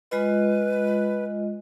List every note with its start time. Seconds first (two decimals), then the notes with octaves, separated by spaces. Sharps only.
0.11 G#3 F4 B4 D#5